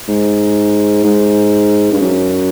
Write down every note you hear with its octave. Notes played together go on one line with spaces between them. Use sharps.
G#2
G#2
G2
F#2